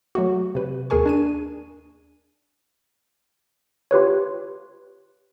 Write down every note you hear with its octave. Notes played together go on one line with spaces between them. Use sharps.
F#3 A3 F#4
C3 B4
D#2 G#4 A#4 G#5 C#6
D4 G#5 D#7
F4 G4 B4 C#5